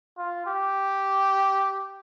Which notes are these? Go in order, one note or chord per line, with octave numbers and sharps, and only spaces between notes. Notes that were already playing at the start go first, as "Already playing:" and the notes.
F4
G4